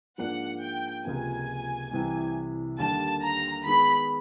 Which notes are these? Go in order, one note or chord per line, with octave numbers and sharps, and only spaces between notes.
G#2 F3 A#3 D4 F#5
G5
C#2 C3 F3 A#3 G#5
C2 C3 E3 G3
D#2 D3 G3 A#3 D4 A5
A#5
D#3 G#3 B3 B5